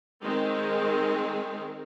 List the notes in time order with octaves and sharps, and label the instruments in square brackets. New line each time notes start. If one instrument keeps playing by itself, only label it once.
[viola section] D#3 G#3 C4